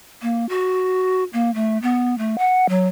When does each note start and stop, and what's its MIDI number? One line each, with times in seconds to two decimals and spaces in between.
0.22 0.46 58
0.49 1.24 66
1.33 1.53 58
1.54 1.78 57
1.82 2.17 59
2.18 2.36 57
2.38 2.66 78
2.69 2.88 54